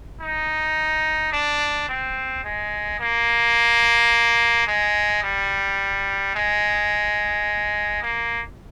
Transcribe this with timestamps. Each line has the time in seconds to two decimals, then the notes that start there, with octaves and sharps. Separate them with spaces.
0.21 D#4
1.33 D4
1.89 C4
2.44 G#3
3.00 A#3
4.67 G#3
5.23 G3
6.35 G#3
8.02 A#3